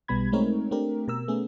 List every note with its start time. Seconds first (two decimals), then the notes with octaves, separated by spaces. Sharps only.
0.08 B1 B2 G3 B3 B5 G#6
0.32 G#3 A3 C4 D#4 A#4 C#5
0.71 A3 C4 D4 G4 A#4
1.08 B2 A#4 E6
1.28 A3 B3 C#4 G#4